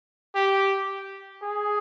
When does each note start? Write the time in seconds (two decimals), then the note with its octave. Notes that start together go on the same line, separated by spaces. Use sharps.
0.35 G4
1.43 G#4